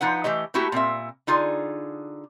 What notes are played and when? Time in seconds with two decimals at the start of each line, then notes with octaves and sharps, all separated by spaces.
0.01 F3 D#4 B4 F#5
0.24 E3 A3 G4 D#5
0.54 A3 A#3 E4 F#4 G4
0.72 A#2 C4 A#4 E5
1.27 D3 D#4 F4 G#4